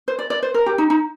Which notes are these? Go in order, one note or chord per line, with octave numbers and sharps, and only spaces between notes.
C5
D5
D5
C5
A#4
G4
D#4
D#4